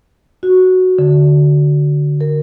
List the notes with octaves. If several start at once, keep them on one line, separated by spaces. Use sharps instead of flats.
F#4
D3
A#4